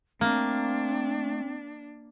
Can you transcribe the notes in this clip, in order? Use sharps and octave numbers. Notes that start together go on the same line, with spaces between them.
A3 A#3 C4 D4